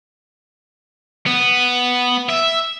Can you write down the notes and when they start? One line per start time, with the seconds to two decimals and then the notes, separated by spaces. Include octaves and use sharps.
1.26 B3
2.29 E5